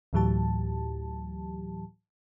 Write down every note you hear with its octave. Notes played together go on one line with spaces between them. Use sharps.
D2 A2 E3 F#3 G4 A5